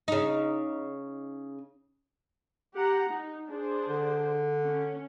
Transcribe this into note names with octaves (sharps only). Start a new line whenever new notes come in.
C#3 D#4
G4 F#5 A#5
D#4
D4 G#4 C5
D3
C#4